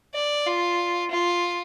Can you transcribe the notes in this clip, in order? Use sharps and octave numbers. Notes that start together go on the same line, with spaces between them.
D5
F4
F4